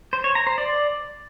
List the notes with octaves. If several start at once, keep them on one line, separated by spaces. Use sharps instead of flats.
C5
C#5
A#5
C5
D5